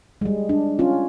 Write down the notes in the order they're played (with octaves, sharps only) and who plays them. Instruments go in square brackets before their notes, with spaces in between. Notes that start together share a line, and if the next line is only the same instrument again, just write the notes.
[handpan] G3 G#3
D4
C#4 F4